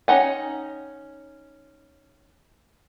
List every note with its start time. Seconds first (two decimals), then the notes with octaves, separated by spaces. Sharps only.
0.08 C#4 D#4 F#5 G#5